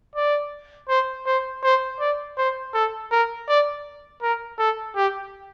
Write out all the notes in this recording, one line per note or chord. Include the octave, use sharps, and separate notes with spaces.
D5
C5
C5
C5
D5
C5
A4
A#4
D5
A#4
A4
G4